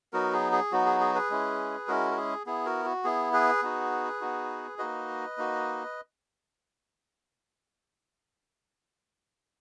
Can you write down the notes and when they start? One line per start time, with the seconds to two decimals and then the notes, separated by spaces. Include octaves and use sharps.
0.13 F#3 B3 D#4 F#4 A#4
0.33 G#4
0.52 G#4
0.72 F#3 B3 D#4 F#4
0.86 G#4
1.00 G#4
1.15 G#4 B4
1.30 G#3 C#4 E4
1.88 G#3 C#4 E4 F#4 A#4
2.11 A#4
2.17 G#4
2.46 B3 E4 G#4
2.66 F#4 A#4
2.85 F#4
3.04 B3 E4 G#4
3.33 G#4 B4
3.62 B3 D#4 F#4
4.21 B3 D#4 F#4
4.78 A#3 D#4 F#4 B4 D#5
5.38 A#3 D#4 F#4